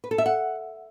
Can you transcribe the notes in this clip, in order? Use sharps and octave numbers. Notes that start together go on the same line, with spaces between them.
B4
A4
E5
F#5